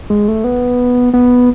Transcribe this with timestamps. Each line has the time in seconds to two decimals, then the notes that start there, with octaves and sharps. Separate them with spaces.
0.10 G#3
0.28 A3
0.44 B3
1.14 B3